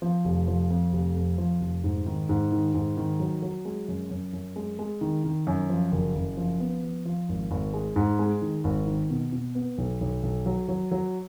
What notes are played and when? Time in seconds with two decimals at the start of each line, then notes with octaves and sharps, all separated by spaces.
0.02 F3
0.25 F1
0.48 F3
0.70 F2
0.93 F1
1.15 F2
1.38 F3
1.61 F1
1.84 G#2
2.06 D#3
2.29 G#2
2.52 D#3
2.74 G#2
2.97 D#3
3.20 F#3
3.42 F#3
3.65 G#3
3.88 F#2
4.10 F#2
4.33 F#2
4.56 G#3
4.79 G#3
5.01 D#3
5.24 D#3
5.47 F#2
5.69 F3
5.92 F#1
6.15 F#1
6.37 F3
6.60 B3
6.83 F3
7.05 F3
7.29 G#1
7.51 G#1
7.74 G#3
7.96 G#2
8.19 G#3
8.42 D#3
8.64 G#1
8.87 D#3
9.10 B2
9.32 B2
9.55 B3
9.78 B1
10.01 B1
10.23 B1
10.46 F#3
10.68 F#3
10.91 F#3